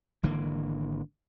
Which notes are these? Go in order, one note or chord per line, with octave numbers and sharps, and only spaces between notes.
G#1 D3 E3 A#3